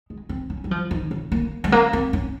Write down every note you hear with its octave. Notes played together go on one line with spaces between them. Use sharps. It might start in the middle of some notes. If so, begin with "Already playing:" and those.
G#3
C4
C#4
G3
F3
D#3
C#3
A#3
G#3
A#3
C4
C#4